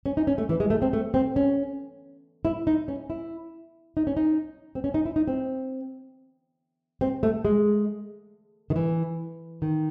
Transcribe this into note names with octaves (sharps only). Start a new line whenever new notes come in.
C#4
D#4
C#4
A3
E3
G#3
A3
C4
A3
C4
C#4
E4
D#4
C#4
E4
D#4
C#4
D#4
C4
C#4
D#4
E4
D#4
C4
C4
A3
G#3
D#3
E3
D#3